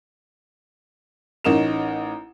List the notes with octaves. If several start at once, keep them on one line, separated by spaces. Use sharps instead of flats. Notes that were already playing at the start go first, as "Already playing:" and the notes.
A1 C#4 D#4 A#4 E7